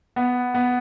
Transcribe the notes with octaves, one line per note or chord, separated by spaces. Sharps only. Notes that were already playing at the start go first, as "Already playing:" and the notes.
B3
B3